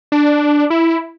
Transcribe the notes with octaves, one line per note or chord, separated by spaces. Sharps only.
D4
E4